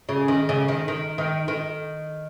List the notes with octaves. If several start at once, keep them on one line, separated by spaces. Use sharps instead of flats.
C#3
D#3
C#3
D#3
D#3
D#3
D#3